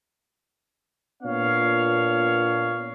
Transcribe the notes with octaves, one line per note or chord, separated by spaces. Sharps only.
A#2 B3 D4 C#5 F5